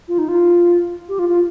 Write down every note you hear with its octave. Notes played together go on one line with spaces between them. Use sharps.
F4
D#4
F4
G4
F4
F4